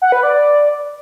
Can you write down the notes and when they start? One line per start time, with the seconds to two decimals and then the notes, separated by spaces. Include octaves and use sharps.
0.02 F#5
0.12 B4
0.23 D5
0.34 D5